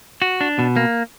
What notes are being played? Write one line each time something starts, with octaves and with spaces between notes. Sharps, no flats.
F#4
D4
B2
A#3